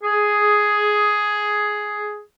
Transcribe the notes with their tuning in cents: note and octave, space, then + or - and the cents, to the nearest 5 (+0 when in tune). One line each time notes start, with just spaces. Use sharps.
G#4 +5